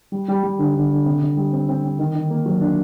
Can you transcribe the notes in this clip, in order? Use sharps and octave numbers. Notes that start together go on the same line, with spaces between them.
G3
G3
G3
D3
D3
D3
C3
C3
G3
C4
C4
C4
D#3
D#3
A#3
F#3
D4